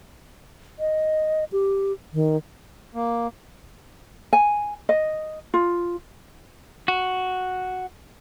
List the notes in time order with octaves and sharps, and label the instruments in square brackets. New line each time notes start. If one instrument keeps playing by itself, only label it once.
[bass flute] D#5
G4
D#3
[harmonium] A#3
[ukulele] G#5
D#5
F4
[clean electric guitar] F#4